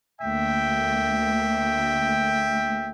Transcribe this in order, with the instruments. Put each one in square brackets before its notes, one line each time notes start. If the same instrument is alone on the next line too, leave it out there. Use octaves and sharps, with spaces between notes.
[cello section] D2 A3 A#3 [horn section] E5 G5